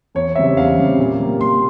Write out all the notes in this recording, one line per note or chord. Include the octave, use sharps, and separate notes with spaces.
E2 C#5
C#3 G3 C4 E5
E2 F5
C#3 G3 C4
A#2
G3 A#3
A#2 C6